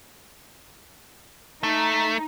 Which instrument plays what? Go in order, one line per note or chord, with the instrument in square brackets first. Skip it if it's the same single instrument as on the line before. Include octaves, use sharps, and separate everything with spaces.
[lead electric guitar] A3 [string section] D#4